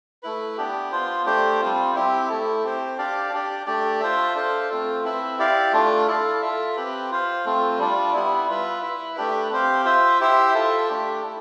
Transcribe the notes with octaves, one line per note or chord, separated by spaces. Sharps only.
A3 E4 B4
B3 D4 G4
B3 F4 C5
A3 D4 G4 C5
G3 C4 F4
C4 E4 G4
A3 E4 A4
C4 G4 C5
D4 G4 D5 F5
D4 G4 D5
A3 D4 G4 D5
F4 C5 E5
D4 A4 C5 F5
A3 C4 F4 A4
C4 E4 B4 E5
E4 G4 D5 F5
A3 D4 F4
E4 A4 D5 F5
F4 A4 E5
C4 G4 B4
F4 C5 F5
A3 C4 F4
G3 D4 F4
G3 B3 E4
F4 B4 E5
E4 B4 E5
A3 D4 G4 B4
C4 G4 C5 F5
F4 C5 E5
E4 G4 C5 E5
F4 A4 E5
A3 D4 G4
E4 A4